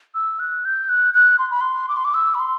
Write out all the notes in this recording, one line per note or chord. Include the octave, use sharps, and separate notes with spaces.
E6
F#6
G6
F#6
F#6
C6
B5
C6
D6
C6
D6
E6
B5
C6